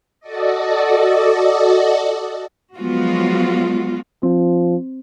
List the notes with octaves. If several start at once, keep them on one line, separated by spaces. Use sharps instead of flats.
F#4 A4 D5 D#5
F3 F#3 G#3 B3 F4 F#4
F3 C4